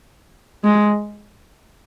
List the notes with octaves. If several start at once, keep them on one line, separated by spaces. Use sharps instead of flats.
G#3